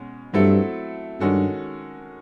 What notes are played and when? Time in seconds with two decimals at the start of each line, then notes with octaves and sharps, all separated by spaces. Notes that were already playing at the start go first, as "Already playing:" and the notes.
Already playing: B2 G#3 C#4
0.34 G2 F#3 A3 C4 E4 A4
1.20 G2 D#3 G#3 C#4 F#4 A4